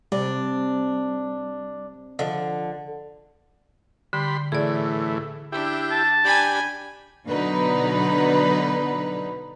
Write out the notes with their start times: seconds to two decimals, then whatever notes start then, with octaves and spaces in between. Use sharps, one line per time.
0.12 C3 G3 D4
2.19 D3 F3 D#5
4.13 D3 G3 B5 C6
4.52 A2 E3 G#4 D5
5.52 D4 E4 G4
5.91 A5
6.25 D4 G4 G#5 B5
7.27 B2 D3 F#3 D#4 B4